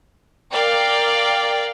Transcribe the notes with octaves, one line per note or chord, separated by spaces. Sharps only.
A#4 D5 F5 G5